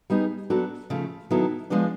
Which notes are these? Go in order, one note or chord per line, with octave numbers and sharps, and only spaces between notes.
G3 B3 D#4 G#4
F#3 B3 D4 F#4 A4
C#3 F3 A3
D#3 F#3 B3 E4 A4
F3 G#3 B3 D4